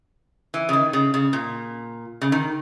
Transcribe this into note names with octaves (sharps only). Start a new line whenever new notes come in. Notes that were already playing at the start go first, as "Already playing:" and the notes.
E3
C#3
D#3
C#3
C#3
A#2
C#3
D#3